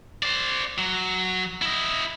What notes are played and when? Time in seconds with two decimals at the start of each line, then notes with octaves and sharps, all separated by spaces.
0.23 C5 D5
0.78 F#3
1.62 E4 D#5